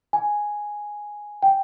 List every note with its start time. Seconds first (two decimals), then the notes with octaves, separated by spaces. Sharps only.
0.13 G#5
1.43 G5